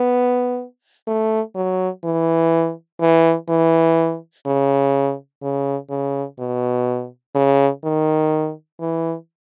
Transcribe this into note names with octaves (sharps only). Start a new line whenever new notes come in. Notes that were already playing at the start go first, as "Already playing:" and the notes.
Already playing: B3
A3
F#3
E3
E3
E3
C#3
C#3
C#3
B2
C#3
D#3
E3